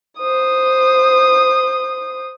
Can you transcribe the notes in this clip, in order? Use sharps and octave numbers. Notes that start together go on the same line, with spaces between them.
C5 D#6